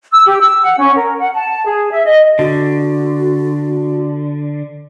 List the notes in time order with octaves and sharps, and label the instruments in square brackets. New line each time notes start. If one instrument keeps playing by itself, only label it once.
[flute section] E6
G4
E6
F#5
C#4
A#4
F#5
A5
G#4
E5
D#5
[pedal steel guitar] D3 [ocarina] F#4